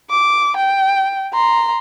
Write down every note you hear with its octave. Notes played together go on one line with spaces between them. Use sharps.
D6
G5
A#5 C6